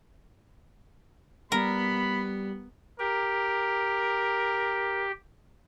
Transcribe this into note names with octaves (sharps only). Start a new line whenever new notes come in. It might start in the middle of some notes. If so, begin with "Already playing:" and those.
G3 B3 A#4 B5
G4 A#4